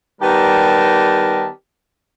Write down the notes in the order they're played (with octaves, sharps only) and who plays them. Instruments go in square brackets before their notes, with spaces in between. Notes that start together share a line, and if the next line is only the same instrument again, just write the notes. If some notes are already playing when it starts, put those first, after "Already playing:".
[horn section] D#3 G3 B3 G4 A#4 A5